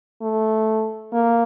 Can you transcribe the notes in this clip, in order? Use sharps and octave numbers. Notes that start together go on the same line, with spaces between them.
A3
A#3